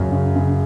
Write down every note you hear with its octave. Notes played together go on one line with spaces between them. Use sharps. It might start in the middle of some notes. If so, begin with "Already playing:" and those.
Already playing: F#2 C#3
C#3
C#3